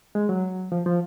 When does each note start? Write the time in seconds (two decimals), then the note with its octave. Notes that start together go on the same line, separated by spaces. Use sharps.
0.15 G#3
0.29 F#3
0.72 F3
0.86 F3